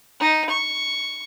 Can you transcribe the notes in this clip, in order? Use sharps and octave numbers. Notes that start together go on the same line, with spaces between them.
D#4
C#6